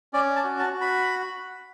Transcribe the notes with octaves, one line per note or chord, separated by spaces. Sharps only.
C#4 D5
A5
F#4
A5
F#4
B5